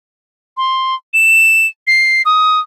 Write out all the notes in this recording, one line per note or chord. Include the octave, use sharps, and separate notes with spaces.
C6
E7
C7
D#6